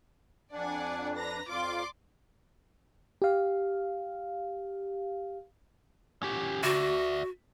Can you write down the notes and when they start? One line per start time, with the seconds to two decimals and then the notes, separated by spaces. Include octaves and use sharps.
0.53 F2 D4 D5 F#5 G#5
1.16 B4 A#5 A#6
1.48 F2 F4 D5 C6 D6
3.22 G4 F5
6.23 C#4 G4
6.63 F#4 D5 E5